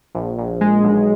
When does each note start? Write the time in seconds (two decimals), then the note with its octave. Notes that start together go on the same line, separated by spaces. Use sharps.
0.15 A#1
0.38 A#1
0.61 G#3
0.84 B1